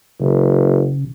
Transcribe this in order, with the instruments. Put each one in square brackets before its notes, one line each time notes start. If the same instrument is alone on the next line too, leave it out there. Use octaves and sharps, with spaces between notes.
[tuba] F#1 [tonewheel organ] C#3